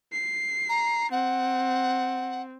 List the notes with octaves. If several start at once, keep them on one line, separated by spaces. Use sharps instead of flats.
C7
A#5
C4 F#5